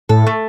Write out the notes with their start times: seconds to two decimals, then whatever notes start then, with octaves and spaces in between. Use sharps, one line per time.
0.09 A2 A4
0.27 A3